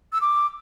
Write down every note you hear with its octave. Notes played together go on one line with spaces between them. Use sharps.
E6
D6